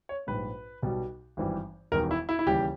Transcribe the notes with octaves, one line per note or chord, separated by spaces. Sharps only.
C#5
A#1 G#2 G3 B4
B1 B2 G3
G#1 G2 E3 G3
E1 E2 D#3 G3 A#4
E4
E4
E4
D#2 C#3 E3 G3 G4